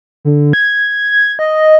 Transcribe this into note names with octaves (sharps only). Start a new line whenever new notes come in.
D3
G#6
D#5